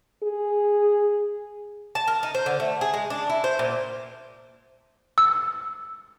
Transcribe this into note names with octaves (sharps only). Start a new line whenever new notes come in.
G#4
A5
A#4
D#4
C5
D3
A3
G#4
G#3
D4
E4
C5
A#2
E6